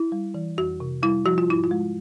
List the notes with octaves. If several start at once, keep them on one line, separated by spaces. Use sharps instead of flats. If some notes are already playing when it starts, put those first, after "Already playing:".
Already playing: E4
G3
E3
F2 F#4
C3
G3 E4
F3 F#4
F4
G#2 E4
F4
G#3